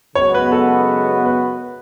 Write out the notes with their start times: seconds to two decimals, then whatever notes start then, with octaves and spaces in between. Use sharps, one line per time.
0.15 F#2 C#3 G#3 B3 F#4 C#5
0.34 B4
0.52 A4
1.25 B4